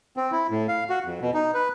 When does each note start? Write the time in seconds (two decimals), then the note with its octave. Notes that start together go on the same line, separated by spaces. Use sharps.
0.17 C4
0.32 E4
0.50 A2
0.68 F5
0.90 F#4
1.05 F2
1.21 B2
1.34 D#4
1.54 B4